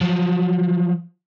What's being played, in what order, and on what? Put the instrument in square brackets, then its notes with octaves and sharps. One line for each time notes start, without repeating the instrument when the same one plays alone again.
[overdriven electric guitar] F3 F#3